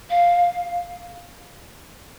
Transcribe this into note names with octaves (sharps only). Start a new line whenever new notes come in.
F5